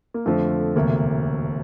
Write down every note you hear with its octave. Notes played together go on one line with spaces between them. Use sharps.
A#3
F2 D3 F3 A3
E1 D2 C3 A#3